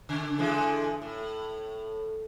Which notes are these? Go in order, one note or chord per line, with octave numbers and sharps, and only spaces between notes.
C#3
D3 E3 G#3
A2